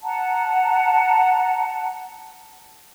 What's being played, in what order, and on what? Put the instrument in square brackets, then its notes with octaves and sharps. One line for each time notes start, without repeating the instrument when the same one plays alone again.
[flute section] F#5 A5 A#5